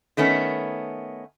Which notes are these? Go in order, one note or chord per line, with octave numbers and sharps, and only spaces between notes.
D#3 A3 B3 C#4